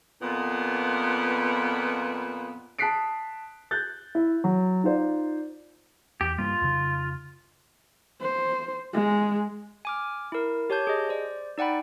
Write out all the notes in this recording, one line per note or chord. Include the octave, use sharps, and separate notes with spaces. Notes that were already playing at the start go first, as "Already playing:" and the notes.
F2 A#2 B3
A5 D#6 F#6 B6 C7 D7
F#6 G6 A6
E4
F#3
D#4 F4 C5 D5
E2 G4
G2 G3 A#3 F4
F2 C#3
C5
G#3
G#5 D6 F6
E4 A#4
G4 C#5 A5 G6 G#6
G#4 D#5
C5 D5
D#4 D5 F#5 G5 B5